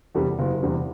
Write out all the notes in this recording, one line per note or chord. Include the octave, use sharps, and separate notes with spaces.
E2 C3 G3
F#1
E2 C3 G3